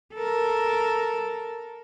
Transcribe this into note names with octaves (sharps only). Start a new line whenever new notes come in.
A4 A#4